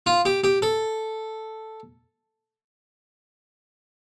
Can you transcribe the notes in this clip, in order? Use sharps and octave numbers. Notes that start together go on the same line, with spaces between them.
F4
G4
G4
A4